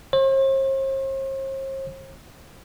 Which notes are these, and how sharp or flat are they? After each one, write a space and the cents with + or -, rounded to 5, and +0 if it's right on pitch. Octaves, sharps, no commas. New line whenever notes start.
C5 +45